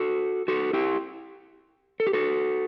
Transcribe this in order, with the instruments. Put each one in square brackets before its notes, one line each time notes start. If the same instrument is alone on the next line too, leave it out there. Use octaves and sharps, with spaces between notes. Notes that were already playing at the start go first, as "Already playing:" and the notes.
Already playing: [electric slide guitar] F#4 A4
F#4 A4
E4 G4
A4
G4
F#4 A4